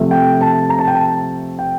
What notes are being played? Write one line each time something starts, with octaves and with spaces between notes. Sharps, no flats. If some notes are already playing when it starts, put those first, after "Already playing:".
Already playing: C3 F3 A3
G5
A5
A#5
A5
G5
A5
G5